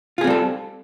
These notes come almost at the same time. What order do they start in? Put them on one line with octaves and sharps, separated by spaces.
F4 G#4 C4 G3 A4